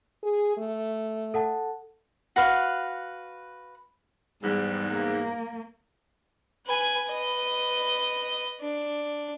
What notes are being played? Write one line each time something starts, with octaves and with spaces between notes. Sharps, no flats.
G#4
A3
A4 F#5 A5
F#4 B4 F5
E2 G#2 G3
A#3
B4 G#5
B4 D#5
D4